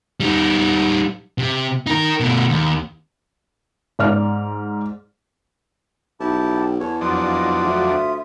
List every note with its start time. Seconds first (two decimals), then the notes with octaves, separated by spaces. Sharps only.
0.20 G3 D#4
1.38 C3
1.87 D#4 A#4
2.20 B2 A3
2.49 D#2
3.99 G#2 D5 F6
6.20 B1 E4 G4 A5
6.56 G5
6.80 E2 C#5 A5
7.01 F2 F#3 D4 F4 D5 D#6
7.30 D#5
7.64 D2 E5